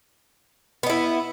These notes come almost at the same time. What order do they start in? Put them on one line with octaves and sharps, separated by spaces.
B3 D#4 E4